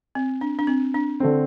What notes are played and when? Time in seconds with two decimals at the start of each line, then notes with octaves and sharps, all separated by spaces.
0.15 C4
0.41 D4
0.59 D4
0.67 C4
0.94 D4
1.20 D3 A3 C4